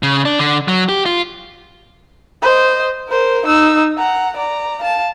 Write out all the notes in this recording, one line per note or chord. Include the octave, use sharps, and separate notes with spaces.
C#3
D4
D3
F#3
G4
F4
C5 D#5
A#4 C5
D#4 E6
F#5 A#5
D5 A#5
F5 A5